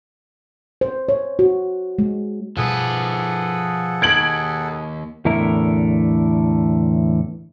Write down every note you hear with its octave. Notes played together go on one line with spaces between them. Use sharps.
C5
C#5
F#4
G#3
G2 B2 F3 G#4 A4 B4 F#5
D#2 G#6 D7 F#7
E2 A2 D3 A3 E4 A#4